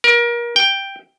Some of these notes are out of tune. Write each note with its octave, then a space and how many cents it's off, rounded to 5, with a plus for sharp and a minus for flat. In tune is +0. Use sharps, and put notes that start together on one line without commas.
A#4 +30
G5 +5